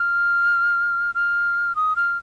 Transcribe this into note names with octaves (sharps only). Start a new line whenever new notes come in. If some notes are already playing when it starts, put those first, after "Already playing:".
Already playing: F6
F6
D#6
F6